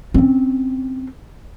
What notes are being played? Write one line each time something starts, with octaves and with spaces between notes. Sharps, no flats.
C4 C#4